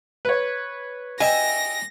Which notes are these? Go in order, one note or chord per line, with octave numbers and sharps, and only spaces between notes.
B4 C#5
D#5 E5 G5 G#5 A#6